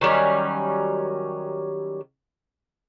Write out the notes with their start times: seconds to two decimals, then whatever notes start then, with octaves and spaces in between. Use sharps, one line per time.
0.01 D#3 F#3 G3 C#4